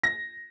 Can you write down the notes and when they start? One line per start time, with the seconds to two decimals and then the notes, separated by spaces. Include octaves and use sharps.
0.04 A#6